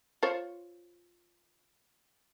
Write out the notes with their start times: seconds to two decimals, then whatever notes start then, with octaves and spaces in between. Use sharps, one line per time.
0.23 F4 C5 C#5